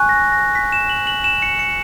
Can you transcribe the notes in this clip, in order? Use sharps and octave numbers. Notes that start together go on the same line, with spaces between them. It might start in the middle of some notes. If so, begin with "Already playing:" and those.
Already playing: G#5 C#6 F#6
A#6
A#6
B6
E7
F#7
F#7
E7
C#7
C#7